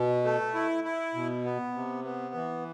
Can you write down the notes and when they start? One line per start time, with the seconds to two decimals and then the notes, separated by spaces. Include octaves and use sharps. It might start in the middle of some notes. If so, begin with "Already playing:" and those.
Already playing: B2
0.24 A3
0.54 E4
0.84 E4
1.14 B2
1.44 B3
1.74 C3
2.04 B3
2.35 E3